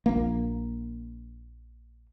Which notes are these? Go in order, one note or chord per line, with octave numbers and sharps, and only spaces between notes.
A#1 A#3